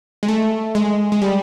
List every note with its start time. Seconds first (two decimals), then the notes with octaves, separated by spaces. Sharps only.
0.23 G#3
0.28 A3
0.75 G#3
1.12 G#3
1.22 G3